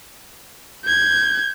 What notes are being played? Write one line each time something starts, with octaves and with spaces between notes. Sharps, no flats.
G6 G#6